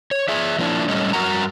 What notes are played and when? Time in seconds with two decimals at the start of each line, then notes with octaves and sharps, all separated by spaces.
0.11 C#5
0.28 G#4 D5 E5
0.59 F3 A#3 C4 D4 E4
0.88 A2 G3 C#4 A4 D#5
1.13 G2 B3 F#4 A#4 F#5 A#5